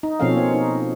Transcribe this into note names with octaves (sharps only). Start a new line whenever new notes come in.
D#4
B2 F3 C4 C#4 A4 F5
A#3 C#5
D#4